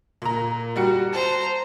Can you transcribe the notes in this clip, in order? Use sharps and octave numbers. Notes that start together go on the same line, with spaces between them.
A#2 A#5
G3 F#4 C#7
C5 A5 A#5